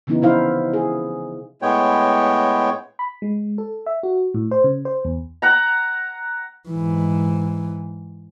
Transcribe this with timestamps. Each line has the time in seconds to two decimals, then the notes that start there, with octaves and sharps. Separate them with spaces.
0.07 C#3 E3 B3 D#4 E4
0.22 C3 F3 D#4 E4 C5 F5
0.73 G#4
1.62 A2 G#3 B3 C#5 G5
2.99 B5
3.22 G#3
3.58 A4
3.86 E5
4.03 F#4
4.34 A2
4.51 C5
4.64 C#3
4.85 C5
5.05 E2
5.42 F#5 A#5
6.69 G#2 E3